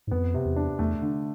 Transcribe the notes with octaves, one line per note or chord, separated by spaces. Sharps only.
G#2
F2 B3
C3
E2
D4
E2 A3
D3